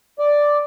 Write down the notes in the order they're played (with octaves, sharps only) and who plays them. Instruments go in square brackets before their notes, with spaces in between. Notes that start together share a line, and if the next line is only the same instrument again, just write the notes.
[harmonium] D5